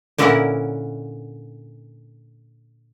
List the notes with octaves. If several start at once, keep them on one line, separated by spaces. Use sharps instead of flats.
A#2 D3 C#4 E4 A#4 F#5